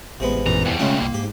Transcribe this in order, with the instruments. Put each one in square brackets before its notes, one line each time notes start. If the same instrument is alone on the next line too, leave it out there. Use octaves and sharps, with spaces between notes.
[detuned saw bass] A1 [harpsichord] C3 G#3 B3
[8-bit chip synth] F#2 A#2 E3 [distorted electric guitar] A#5
[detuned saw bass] E2 [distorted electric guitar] G2 B2
[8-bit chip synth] C#3 G#3 A3 [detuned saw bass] C#4 [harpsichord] F4
[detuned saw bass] C2 [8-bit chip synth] A#3
[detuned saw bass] G#2 [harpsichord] G4